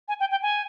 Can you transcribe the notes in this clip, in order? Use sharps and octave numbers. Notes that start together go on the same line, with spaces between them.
G#5
G5
G5
G#5